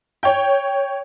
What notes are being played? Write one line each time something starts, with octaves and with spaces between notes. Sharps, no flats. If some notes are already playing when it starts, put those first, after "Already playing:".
C#5 G5